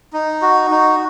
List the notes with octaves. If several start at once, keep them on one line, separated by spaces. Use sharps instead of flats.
D#4
F#4
D#4